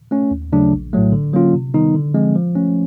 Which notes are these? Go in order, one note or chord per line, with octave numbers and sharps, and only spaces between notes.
A3 C#4
D#2
C#3 F#3 A3 D4
A#1
A2 F#3 A3
D3
F#3 A#3 C#4 F4
C3
D#3 G3 B3 D#4
D3
F3 G#3 C4
F3
A3 C#4